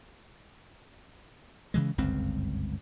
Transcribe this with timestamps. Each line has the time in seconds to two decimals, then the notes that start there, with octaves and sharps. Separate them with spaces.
1.74 C#3 E3 G#3
1.98 G1 C#2 F#2 C4